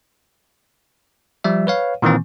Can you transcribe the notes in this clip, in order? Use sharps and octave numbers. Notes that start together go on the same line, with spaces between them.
F3 G3 E5
B4 C#5 F5
A#2 D#3 E3 A#3 C4